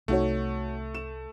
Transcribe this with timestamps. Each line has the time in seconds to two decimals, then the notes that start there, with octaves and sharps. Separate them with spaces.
0.08 C2 A3 D#4 F#4 C#5
0.95 E7